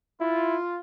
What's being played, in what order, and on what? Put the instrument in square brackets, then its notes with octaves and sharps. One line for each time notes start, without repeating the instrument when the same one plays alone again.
[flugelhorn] E4 [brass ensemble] F4